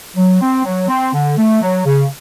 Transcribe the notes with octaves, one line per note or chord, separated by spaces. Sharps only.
F#3
C4
F#3
C4
D3
A3
F#3
C#3